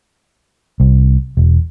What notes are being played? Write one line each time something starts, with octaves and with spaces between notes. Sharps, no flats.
C2
E1